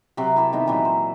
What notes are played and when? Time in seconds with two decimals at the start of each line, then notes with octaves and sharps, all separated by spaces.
0.17 C3 F#3
0.36 E4 G4 A4
0.53 D#3 B3 D#4 E5
0.66 A#2 E3 F#3
0.85 C5